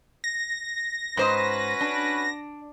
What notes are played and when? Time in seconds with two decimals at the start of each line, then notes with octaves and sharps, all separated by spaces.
0.24 A#6
1.17 G#2 C#4 F#4 B4 C5 D#5
1.81 D4